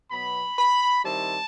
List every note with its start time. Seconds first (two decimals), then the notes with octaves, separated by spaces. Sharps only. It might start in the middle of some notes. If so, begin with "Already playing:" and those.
0.11 B2 F#3 B3 B5
0.58 B5
1.04 D#3 G3 C4 E4 A5